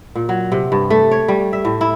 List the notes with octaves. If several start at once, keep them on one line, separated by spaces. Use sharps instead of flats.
A#2
F#3
C3
G2
A3
C#5
G3
E5
A2
E4